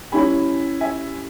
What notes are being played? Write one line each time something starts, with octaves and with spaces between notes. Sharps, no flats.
G3 C#4 E4 G#5 B5
E5 G#5